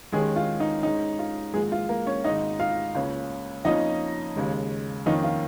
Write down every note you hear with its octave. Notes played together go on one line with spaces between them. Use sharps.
D#2 D#3 G#3 C#4 G#4
F4
D#4
G#2 G#3 C#4 D#4
F4
G#1 G#2 F3 G#3 A#3 G#4
F4
A#3 A#4
C#4 C#5
G#1 G#2 G#3 D#4 D#5
F4 F5
C#2 C#3 A#3 C#4
F2 F3 A#3 C#4 D#4 D#5
D#2 C#3 G#3
F2 D#3 A#3 C#4 D#4
F4